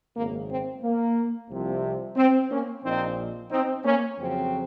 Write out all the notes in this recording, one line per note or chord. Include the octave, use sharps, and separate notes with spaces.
G#1 F#2 C#3 A#3
C4
A#3
C2 C3 F3
C4
A#3 C#4
A#1 A#2 F3 C4 D#4
C4 D#4
A#3 C#4
F2 C#3 F#3 C4